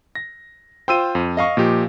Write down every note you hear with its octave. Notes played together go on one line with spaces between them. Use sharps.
A#6
F4 C5 G5 E6 D#7
F2
D#5 F5 C#6
A#2 F3 G4